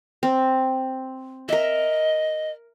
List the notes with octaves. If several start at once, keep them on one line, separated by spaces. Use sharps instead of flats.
C4
A#4 D#5 E5